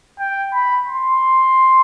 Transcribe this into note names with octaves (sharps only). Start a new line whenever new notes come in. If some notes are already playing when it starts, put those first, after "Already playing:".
G5
B5
C6